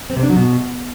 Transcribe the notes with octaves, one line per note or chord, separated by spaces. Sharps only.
C4
C3
D4
F#3
B2